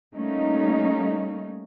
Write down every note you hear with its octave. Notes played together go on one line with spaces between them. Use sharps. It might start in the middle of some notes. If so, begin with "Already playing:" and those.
G3 A3 A#3 C#4 D#4